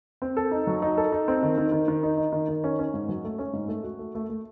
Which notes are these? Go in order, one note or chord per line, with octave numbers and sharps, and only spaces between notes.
C4
A4
D#4
F#3
D#4
A4
D#4
C4
D#3
D#3
D#3
D#3
D#4
D#4
D#3
D#3
C#4
C#4
G#2
F#3
A3
C#4
G#2
A3
F#4
A3
A3
A3